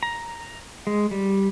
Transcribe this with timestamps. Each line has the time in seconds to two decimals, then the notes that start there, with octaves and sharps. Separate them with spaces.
0.03 A#5
0.87 G#3
1.11 G3